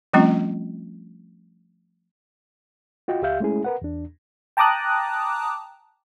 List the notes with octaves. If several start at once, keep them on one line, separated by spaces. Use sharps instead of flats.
F3 G3 A3 C4 C#4 F4
F4 F#4 D#5 G5
C#2 G4 E5 F5 G6
G#3 A3 C#4 E4 G#4
A#4 B4 F#5
E2 D4
G5 A5 A#5 D6 D#6 F#6